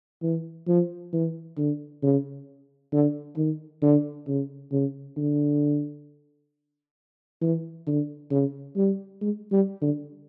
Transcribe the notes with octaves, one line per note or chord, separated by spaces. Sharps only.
E3
F3
E3
D3
C#3
D3
D#3
D3
C#3
C#3
D3
E3
D3
C#3
G3
G#3
G3
D3